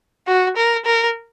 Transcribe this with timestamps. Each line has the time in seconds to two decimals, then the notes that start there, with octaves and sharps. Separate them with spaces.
0.28 F#4
0.57 A#4
0.86 A#4